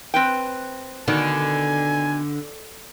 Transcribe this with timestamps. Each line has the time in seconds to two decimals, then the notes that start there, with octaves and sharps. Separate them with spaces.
0.14 C4 B4 G5
1.08 B2 D3 D#3 G#5